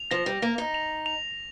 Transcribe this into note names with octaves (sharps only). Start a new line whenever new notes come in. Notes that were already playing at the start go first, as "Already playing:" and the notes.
Already playing: F7
F3 A#6
G3
A#3 A#6
D#4
F7
F7